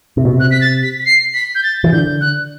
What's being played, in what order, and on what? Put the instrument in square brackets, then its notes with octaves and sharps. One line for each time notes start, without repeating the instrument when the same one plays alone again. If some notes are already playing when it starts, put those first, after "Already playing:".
[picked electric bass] C3
B2
C3
[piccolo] F#6
B6
A6
B6
B6
C7
B6
G6
A6
[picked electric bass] E3
[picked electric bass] D3 [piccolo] G6
[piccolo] F#6